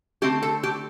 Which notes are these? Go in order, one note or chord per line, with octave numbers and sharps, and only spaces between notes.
D3 A3 C4 G4
A4
G4